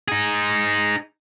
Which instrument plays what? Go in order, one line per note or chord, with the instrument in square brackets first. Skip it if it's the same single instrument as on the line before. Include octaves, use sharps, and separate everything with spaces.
[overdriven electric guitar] D#4 G#4